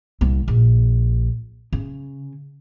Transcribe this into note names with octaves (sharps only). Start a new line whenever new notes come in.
C2
A#1
C#3